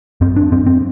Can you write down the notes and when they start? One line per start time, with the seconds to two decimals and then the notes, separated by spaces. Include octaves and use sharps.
0.21 F#2 C4
0.36 D4
0.52 F#2 C4
0.66 C4